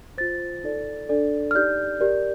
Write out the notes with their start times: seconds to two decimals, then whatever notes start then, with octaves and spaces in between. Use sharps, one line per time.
0.18 F4 C5 A6
0.64 D#4 A4 D5
1.09 D4 A4 D5
1.51 F6
1.55 D#4 G4 D5 G6
2.01 G4 A#4 D5